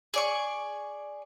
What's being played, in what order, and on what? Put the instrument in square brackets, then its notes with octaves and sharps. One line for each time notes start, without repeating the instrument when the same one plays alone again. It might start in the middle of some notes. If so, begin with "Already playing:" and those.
[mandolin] G#4 D5 C#6